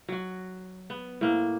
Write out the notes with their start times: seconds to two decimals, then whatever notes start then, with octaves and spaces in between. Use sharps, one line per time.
0.09 F#3 F#4
0.90 B3
1.21 A2 A#3